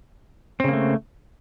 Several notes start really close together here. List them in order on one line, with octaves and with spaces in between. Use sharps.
C4 C#3 A#3 A3